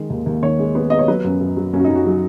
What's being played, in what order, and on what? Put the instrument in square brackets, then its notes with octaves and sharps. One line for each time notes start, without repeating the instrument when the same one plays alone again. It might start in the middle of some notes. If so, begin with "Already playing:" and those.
Already playing: [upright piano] D#3 G#3
D#2
D#2
D#3 C#5
G#3
B3
B3 D#5
C#5
F#3 B4
F#2
F#2
F#3
F#2 C#4
F#4
D#4
F#2
F#4
F#3